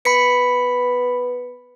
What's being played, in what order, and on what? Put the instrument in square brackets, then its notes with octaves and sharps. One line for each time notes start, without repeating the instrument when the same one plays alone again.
[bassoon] B3 [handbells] B5 B6 C#7